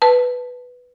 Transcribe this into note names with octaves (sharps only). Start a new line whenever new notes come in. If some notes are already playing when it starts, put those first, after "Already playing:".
B4 A5